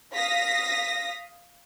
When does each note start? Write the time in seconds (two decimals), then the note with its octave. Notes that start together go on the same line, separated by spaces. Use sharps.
0.14 F5 D#6 A#6 B6